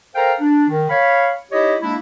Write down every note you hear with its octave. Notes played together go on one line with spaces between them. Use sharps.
A4 A#4 C5 F5 G5 A#5
D4
D#3
C#5 F5 B5
D#4 E4 G4 C#5 D#5
G#3 A#3 D4 E4